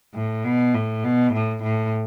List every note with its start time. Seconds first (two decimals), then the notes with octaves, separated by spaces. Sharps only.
0.14 A2
0.45 B2
0.74 A2
1.04 B2
1.33 A2
1.63 A2